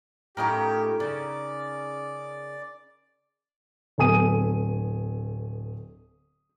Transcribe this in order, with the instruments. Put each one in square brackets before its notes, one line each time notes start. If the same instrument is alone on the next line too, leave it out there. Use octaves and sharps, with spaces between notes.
[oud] A2 A3 F4 [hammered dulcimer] C#4 D#4 A#4 [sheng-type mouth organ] G4
[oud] C#3 [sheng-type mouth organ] D5
[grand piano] D1 B3 A4 G#5 D#6 D#7